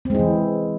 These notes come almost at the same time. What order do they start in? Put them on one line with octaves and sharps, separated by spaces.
C4 G#3 E4 E3